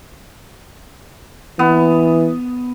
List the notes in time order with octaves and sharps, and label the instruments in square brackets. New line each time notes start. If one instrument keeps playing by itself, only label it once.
[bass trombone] E3 [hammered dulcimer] B3